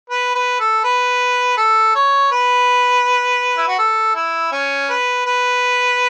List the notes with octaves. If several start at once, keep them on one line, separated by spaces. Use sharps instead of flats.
B4
B4
A4
B4
A4
C#5
B4
E4
F#4
A4
E4
C#4
B4
B4